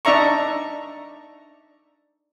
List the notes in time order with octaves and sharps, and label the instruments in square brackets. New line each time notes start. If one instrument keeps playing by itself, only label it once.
[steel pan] D4 D#4 D5 E5 A#5 C#6